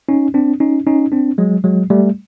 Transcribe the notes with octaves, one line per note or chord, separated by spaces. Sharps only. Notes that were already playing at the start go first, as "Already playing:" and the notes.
C#4 D#4
C4 D4
C#4 D#4
C#4 D#4
C4 D4
F#3 G#3
F#3 G#3
G3 A3